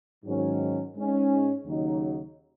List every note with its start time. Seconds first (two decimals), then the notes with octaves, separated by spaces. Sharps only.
0.24 G#2 D#3 F#3 C#4
0.95 G#2 G#3 C#4
1.65 D#2 C#3 F#3 D#4